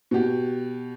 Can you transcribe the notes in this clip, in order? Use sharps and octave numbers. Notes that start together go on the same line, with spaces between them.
B2 G4